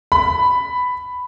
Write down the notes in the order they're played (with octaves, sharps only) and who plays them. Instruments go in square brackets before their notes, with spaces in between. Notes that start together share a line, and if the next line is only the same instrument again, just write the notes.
[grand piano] B5